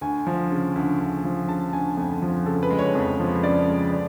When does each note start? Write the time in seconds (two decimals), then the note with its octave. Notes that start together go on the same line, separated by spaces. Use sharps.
0.01 D2 G#5
0.27 F3
0.51 C#3
0.75 D2
1.00 D2
1.25 F3
1.48 C#3 A5
1.73 D2 G#5
1.97 F2
2.22 F3
2.46 C#3 A4
2.63 B4
2.70 G#3
2.79 C#5
2.95 F2
3.20 F3
3.43 C#3 D5
3.68 G#3
3.93 D5